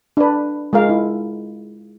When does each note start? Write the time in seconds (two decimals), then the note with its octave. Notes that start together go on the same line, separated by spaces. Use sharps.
0.17 D4 B4
0.73 G#3 F4 A#4 F5
0.89 E4